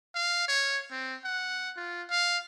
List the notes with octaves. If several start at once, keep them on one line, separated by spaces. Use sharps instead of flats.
F5
C#5
C4
F#5
F4
F5